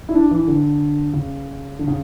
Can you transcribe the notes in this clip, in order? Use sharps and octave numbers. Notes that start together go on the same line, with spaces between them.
E4
D4
E3
D3
C#3
D3
C#3